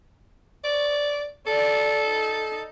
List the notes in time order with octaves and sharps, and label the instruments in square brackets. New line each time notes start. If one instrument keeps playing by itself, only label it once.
[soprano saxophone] D5
[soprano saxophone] A4 [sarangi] D5
[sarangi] D#4